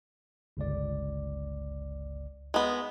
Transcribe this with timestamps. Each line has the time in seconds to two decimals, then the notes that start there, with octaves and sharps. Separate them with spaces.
0.57 G1 C#2 D5
2.54 G#3 B3